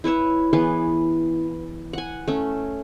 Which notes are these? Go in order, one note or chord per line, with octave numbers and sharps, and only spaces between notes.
E4 B4 C#5 E5
E3 B3 G#4 B4
F#5 G#5
A3 C#4